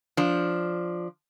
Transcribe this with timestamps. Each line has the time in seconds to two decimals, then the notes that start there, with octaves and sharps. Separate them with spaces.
0.17 F3 D4